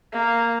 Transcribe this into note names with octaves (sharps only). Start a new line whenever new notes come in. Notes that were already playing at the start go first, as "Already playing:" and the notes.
A#3